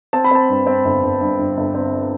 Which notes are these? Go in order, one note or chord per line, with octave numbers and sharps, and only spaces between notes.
C4 A5
B5
C4 A5
G2
C4
G1
G1
G2
G1
G1
C4